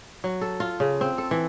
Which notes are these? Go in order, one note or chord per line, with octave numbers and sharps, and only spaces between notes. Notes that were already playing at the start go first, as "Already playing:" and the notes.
F#3
A4
F4
C#3
C4
A4
E3